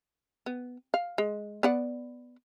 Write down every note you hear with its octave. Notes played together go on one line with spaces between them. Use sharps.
B3
F5
G#3
B3 D5 F#5